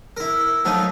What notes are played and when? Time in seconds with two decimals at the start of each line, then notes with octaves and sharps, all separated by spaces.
0.17 E4 A#4
0.65 F3 F#3 A3 D#4